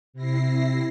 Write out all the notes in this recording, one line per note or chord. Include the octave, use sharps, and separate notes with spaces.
C3 E4 A#6 C7